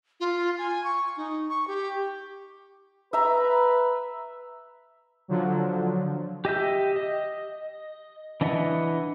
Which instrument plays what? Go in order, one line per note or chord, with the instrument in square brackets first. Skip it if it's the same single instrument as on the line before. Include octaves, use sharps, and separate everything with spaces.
[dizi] F4
G#5
C#6
D#4
C#6
G4
[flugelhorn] B4 [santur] E5 A#5
[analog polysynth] D3 F3 F#3
[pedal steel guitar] G4 D#5 E5 G6
D#5
E3 D4 D#5 E5 F#5